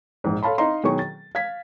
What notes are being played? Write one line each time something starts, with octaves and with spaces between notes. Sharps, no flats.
A#1 G#2
A4 C#5 F5 A5 B5 C6
D#4 D#5 F5 A#5 C6
B2 D#3 F#3 G#4 C#6
A6
F5 G#6 B6